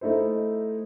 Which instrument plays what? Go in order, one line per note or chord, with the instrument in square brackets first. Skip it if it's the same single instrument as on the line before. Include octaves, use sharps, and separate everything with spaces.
[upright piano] A3 D#4 E4 C5